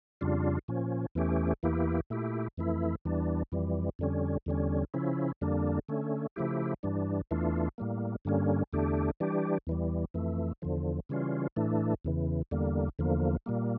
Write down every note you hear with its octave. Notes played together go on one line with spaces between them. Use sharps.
F2 C#3 G3 D4 F4
A#2 F3 C#4
E2 E3 A3 C#4 G4
E2 E3 A#3 E4 G4
A#2 A3 E4 G4
F2 E3 A3 E4
E2 E3 G3 D4
F2 E3 G3
F2 D3 G3 C#4
E2 D3 G3 C#4
C#3 F3 C#4 E4
F2 D3 G3 A#3 D4
D3 A3 C#4
C#3 F3 A3 E4 G4
G2 E3 G3 D4
E2 E3 A3 D4 F4
A2 G3 A#3
G2 D3 G3 A#3 C#4
E2 D3 A3 D4 G4
E3 G3 D4 G4
E2 E3 G3
F2 E3 A3
E2 D3 F3
C#3 E3 G3 C#4 F4
A2 E3 A3 D4
E2 C#3 E3
E2 D3 G3 A#3
E2 D3 F3 A#3
A#2 G3 A#3